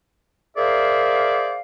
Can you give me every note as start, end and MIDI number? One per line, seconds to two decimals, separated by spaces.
0.57 1.60 68
0.57 1.60 70
0.57 1.60 72
0.57 1.60 74
0.57 1.60 76
0.57 1.60 77